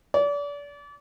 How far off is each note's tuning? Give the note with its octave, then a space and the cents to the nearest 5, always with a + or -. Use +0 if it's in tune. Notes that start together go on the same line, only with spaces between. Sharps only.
D5 -35